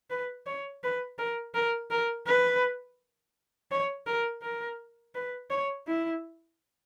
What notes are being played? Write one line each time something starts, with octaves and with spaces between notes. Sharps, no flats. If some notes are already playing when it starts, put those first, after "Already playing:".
B4
C#5
B4
A#4
A#4
A#4
B4
C#5
A#4
A#4
B4
C#5
E4